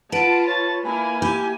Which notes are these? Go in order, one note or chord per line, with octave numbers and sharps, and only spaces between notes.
F4 B4 F#5 A5 D7
C#5 A6
A#3 E4 G#5 B5
G4